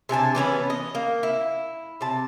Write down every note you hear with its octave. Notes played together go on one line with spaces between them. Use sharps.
C3 D4 G#5 A5
E3 B3 C#4 B4
D#5
A#3
E4
C3 A5